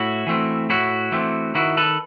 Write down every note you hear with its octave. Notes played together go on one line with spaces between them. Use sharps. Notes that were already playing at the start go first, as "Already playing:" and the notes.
Already playing: A2 E4 F#4
E3 A3 C4
A2 E4 F#4
E3 A3 C4
D#3 E4 F#4
A4 B4